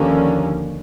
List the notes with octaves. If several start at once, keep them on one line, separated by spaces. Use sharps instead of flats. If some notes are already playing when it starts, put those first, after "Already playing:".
Already playing: D#2 D3 F3 A#3 C#4